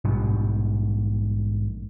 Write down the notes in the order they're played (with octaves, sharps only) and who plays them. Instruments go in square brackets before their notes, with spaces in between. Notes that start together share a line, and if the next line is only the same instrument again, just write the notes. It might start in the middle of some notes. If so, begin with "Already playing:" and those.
[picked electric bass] A#1 G#2 B2 G3